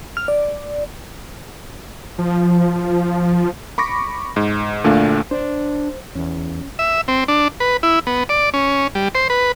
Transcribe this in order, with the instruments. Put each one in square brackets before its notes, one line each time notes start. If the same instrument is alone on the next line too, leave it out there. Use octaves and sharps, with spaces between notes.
[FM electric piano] F6
D5
[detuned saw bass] F3
[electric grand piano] B5 C#6 D6 A#6
G#2
D2 A#2 A3 D4 F5
[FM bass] D4 [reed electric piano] C5
[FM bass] E2 [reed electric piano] C#4
[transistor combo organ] E5
C4
D4
B4
E4
B3
D5
C#4
G3
C5
B4